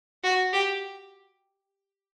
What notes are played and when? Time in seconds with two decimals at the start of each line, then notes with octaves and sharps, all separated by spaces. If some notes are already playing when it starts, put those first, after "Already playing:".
0.23 F#4
0.53 G4